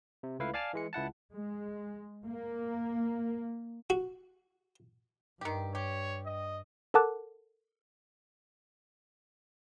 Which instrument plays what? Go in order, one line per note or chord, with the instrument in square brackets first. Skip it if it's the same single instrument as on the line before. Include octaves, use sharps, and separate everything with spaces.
[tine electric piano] C3
C#2 A3 E4 B4 F5
D5 F5 G#5 A5 D6 F6
E3 G#3 C#7
C#2 E4 F#5 A5
[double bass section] G#3
A#3
[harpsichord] F#4
[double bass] G2 [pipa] D#3 G4
[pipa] G4 [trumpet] C#5
[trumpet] D#5
[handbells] A4 A#4 F#5 A5 D6 F#6